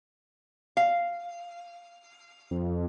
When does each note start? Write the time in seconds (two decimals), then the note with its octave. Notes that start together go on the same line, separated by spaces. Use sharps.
0.77 F5
2.51 F2